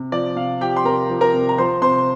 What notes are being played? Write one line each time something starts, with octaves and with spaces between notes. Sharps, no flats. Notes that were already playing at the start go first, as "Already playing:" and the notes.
Already playing: C3
F3 D5
C3 F5
F3 G4 G5
C6
C3 A#4 A#5
F3
A#4 A#5
C3
A#5
F3 C5 C6
C3 C5 C6